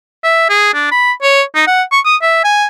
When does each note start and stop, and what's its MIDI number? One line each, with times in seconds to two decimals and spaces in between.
0.24 0.48 76
0.49 0.72 68
0.74 0.90 62
0.91 1.12 83
1.22 1.42 73
1.55 1.62 63
1.67 1.82 78
1.92 2.00 85
2.05 2.16 87
2.22 2.40 76
2.44 2.67 80